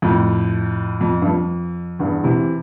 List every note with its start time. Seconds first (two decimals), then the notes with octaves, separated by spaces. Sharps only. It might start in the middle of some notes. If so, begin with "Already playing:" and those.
0.02 F2 A2
1.01 F2
1.22 G2
1.25 F2
1.99 E2 G2
2.24 C3 E3